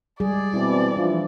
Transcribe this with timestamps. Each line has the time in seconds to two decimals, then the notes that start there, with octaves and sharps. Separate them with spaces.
0.20 G3 G#3 G#4 D5
0.53 B2 E3 C4 E4
0.97 E3 F3 D4